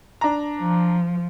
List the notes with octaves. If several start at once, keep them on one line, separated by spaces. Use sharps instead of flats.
D4 A#5
F3